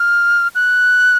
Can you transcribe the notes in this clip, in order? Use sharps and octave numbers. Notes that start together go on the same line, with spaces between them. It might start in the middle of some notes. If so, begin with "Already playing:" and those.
Already playing: F6
F#6